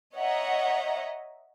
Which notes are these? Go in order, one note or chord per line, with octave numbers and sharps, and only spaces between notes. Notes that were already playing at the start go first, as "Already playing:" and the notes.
C#5 D#5 E5 F#5 A#5